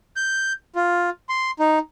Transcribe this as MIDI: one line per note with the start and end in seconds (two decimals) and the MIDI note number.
0.16 0.53 91
0.76 1.10 65
1.29 1.51 84
1.59 1.79 63